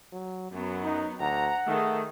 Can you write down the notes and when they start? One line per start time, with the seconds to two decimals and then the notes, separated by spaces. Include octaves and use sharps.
0.12 F#3
0.51 F#2 F#3 B3
0.84 D#4
1.20 D2 F#5 A#5
1.67 D#3 A3 G#4